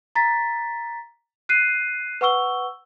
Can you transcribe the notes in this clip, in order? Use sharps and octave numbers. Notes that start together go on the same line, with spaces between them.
A#5 A6 B6
F#6 C7 D#7
B4 F#5 C#6 E6 G7